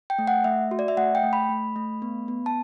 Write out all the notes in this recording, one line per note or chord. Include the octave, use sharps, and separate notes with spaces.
G5
A3
F#5
A3 E5
F#4
D5
E5
A3 F#5
G5
A3
B5
A3
A3
B3
B3
A5